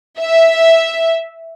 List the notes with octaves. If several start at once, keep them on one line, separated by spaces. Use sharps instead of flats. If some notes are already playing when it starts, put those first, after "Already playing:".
E5